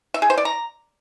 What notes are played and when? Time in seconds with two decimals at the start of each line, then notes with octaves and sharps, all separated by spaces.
0.14 E5
0.22 G#4
0.30 C5
0.37 D5
0.45 A#5